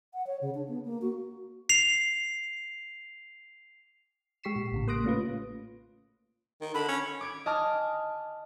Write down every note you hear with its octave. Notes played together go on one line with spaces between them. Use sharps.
F#5
C#5
C#3
D4
B3
A#3
F#4
C7 F7
G#3 G4 C#6 B6 C7 E7
A#2
A1 A2 C#3
A#3 C6 D#6 F#6 A#6 D7
A3 C#4 F4 B4
D#3
D3 B5
C#4
D6 G#6 D7
D#5 G#5 A5 D6 F6